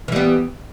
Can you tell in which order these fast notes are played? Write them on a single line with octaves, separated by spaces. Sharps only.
E3 G3 B3